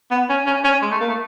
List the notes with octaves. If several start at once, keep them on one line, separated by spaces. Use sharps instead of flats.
B3
C#4
C#4
C#4
G#3
A3
A#3
A3